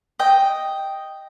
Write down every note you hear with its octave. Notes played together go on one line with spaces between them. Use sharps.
D#5 G5